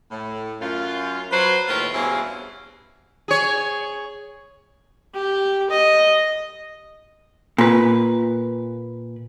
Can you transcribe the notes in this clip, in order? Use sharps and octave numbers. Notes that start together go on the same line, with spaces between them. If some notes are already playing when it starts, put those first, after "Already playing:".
A2
F#2 F4
F#3 B4 C5
D#2 A2 F4 A#4 B4 C#5
E2 G2 B2 E3 C4 C#4
G#4 C#5
G4
D#5
A#2 B4